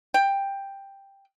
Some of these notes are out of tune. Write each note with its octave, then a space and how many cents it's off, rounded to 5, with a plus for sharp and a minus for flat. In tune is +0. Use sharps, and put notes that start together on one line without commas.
G5 +10